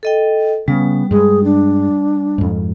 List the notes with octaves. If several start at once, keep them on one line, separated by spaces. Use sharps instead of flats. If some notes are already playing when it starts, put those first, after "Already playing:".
A4 D#5 G5
C#3 G3 B3
G2 G#3 G#4
D4
F2 G#2